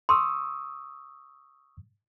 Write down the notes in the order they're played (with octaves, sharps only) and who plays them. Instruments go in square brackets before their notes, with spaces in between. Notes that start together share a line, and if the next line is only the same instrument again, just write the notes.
[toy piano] C6 [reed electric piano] C#6 D#6 E6